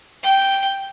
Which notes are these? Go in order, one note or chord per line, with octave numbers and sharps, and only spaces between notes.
G5